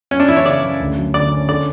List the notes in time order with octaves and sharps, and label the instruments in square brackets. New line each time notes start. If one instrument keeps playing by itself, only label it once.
[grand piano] F#2 [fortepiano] C#4
[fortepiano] D4
[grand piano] E3 [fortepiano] E4
[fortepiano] C#5
[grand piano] C#3 [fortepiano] D5
[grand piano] F#2
D2
F#3
[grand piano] D3 [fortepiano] D5
[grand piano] C#4
[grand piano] D3 [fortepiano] D5